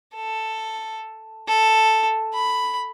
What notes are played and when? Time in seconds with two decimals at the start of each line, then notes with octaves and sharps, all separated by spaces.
0.15 A4
1.48 A4
2.34 B5